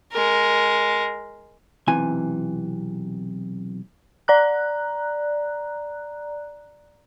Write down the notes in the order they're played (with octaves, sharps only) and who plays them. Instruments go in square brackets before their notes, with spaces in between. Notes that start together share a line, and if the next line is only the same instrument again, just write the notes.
[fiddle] G#3 A#4
[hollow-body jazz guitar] B1 C3 E3 G#5
[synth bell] D5 A#5 F#6